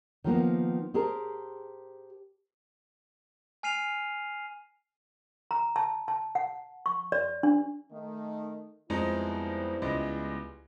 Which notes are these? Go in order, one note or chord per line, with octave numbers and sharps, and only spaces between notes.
D#3 F3 A#3 B3
G4 G#4 A#4 C5 A5
G#5 F6 C7 D#7 F7
A#5
A5
A5
F#5
C#6
D5
D4
D#3 A3
F2 G3 G#3 B3 D#4 E4
C#2 G#3 D#5